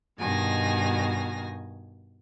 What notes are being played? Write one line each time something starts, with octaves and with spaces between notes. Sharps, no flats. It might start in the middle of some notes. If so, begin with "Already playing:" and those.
G2 B2 D#3 G#5 A#6